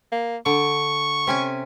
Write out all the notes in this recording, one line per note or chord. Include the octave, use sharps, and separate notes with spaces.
A#3
D3 C#6
C3 C#4 G#5